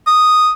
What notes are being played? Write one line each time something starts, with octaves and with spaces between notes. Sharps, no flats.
D#6